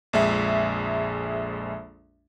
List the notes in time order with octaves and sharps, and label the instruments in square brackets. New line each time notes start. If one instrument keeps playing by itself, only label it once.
[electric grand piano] A#1 F2 G#3 E5